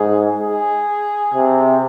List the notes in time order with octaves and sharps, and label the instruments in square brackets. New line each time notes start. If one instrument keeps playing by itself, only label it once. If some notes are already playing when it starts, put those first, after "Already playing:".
Already playing: [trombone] G#2 [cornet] G#4
[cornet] G#4
[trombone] C3